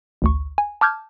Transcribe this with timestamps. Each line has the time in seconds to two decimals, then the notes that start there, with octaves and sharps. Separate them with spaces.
0.22 A1 D2 C#6
0.58 G#5
0.81 A5 D6 F6 G6 G#6